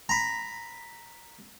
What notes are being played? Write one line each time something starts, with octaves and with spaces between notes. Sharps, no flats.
A#5 B5